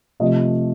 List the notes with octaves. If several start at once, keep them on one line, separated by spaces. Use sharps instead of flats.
C3 F3 A3 D#5